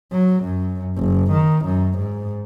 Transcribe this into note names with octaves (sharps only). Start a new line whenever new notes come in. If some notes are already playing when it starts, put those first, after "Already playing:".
F#3
F#2
F#1
D#3
F#2
G#2